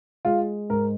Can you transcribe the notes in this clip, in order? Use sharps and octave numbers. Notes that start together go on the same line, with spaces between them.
G#3 F4
G#2 A#4